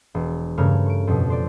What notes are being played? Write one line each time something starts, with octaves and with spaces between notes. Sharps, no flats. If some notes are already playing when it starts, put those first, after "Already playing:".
E1
G2 C#3 A3 A#4 C#5 F6
C#6 D7
F2 B2
C5 D5